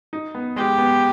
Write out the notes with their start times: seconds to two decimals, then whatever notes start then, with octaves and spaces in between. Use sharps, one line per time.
0.13 D#4
0.35 B3
0.56 G#3 G4
0.78 B3